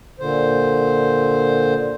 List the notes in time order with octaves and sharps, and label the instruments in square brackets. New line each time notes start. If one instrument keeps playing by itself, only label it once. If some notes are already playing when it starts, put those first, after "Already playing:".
[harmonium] A#2 D3 C5